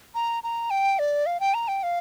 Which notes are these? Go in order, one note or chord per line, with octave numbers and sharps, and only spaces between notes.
A#5
A#5
G5
D5
F5
G5
A#5
G5
F5